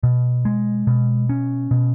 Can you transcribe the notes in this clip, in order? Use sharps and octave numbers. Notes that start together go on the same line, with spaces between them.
B2
G#3
B2
C#4
B2